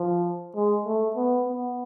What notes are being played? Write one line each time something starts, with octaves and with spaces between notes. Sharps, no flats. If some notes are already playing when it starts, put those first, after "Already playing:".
Already playing: F3
G#3
A3
B3
B3